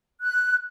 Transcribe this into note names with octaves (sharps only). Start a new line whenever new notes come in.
F#6